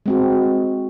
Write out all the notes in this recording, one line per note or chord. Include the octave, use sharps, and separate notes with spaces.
G#3 C4 F#4